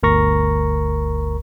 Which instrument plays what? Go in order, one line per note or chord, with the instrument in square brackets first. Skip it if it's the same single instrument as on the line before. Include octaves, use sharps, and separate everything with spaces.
[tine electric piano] G1 D2 A#4 A#5 C#6 A#6